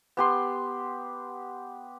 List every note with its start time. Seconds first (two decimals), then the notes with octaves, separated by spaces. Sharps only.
0.17 B3 G4 C6